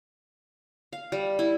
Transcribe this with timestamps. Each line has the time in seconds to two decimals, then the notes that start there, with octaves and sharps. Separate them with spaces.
0.93 F5
1.12 G3
1.39 E4